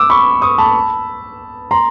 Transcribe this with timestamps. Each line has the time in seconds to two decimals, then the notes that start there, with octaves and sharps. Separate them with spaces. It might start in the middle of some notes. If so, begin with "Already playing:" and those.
Already playing: D6 E6
0.10 B5 C#6
0.42 C#6 D#6
0.58 A5 B5
1.71 A#5 C6